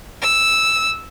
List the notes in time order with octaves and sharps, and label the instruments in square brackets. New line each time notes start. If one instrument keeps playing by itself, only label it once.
[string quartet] E6